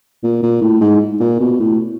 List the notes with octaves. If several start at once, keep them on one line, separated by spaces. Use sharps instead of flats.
A#2
A#2
A2
G#2
A#2
B2
A2